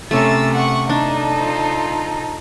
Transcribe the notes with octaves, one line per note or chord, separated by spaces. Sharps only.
C3 A3 C#4 A#4 E6 A6
F#5 C#6
D4 D#4 A4
F4 C5